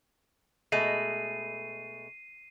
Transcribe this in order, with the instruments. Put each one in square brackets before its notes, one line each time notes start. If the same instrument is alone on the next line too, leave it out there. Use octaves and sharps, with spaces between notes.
[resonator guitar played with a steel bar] B2 G#3 A3 [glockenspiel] C7 D#7